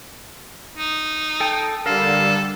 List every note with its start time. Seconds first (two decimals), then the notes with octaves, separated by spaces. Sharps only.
0.78 D#4
1.40 A4 G5
1.86 D3 G3 A4 A#4 F5